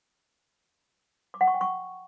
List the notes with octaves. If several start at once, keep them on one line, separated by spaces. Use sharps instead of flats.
D6
F#5
C#6
G5
C#6